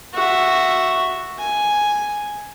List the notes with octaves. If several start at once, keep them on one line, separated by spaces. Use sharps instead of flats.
F#4 E5
G#5